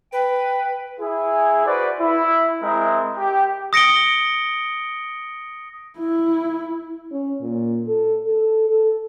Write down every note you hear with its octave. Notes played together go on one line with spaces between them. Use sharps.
B4 G5
E4 G#4
F#4 B4 C5 D5
E4
G#3 C4 E4 A#4 D#5
G4
D#6 A#6 C#7 D7 G7
E4
C#4
A#2
A4
A4
A4